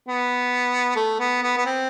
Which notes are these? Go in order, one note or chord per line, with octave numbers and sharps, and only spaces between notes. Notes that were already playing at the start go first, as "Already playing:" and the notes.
B3
A3
B3
B3
B3
C4